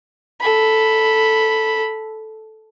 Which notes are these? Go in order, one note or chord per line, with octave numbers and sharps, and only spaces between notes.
A4 B5